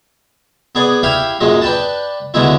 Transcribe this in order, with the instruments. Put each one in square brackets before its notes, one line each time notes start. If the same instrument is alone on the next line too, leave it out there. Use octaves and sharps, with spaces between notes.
[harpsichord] B3 G#4 D5
E4 G4 F5 G5
F#2 A#2 G#3 D#5
D4 B4 G5 A5
D2 D3 G#3 B3 E4